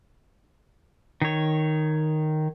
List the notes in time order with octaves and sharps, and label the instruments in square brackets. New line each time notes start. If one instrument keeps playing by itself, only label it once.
[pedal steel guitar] D#3 C#5